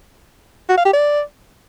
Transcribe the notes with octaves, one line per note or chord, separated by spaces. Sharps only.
F#4
F5
G4
D5